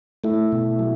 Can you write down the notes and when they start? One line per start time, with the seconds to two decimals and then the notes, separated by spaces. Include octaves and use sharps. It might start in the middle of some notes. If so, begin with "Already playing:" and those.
0.24 A3 E4
0.52 B2
0.79 F#3